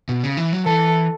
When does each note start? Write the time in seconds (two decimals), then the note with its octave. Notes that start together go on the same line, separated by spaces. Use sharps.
0.09 B2
0.23 C#3
0.37 E3
0.53 F#3
0.66 E3 A4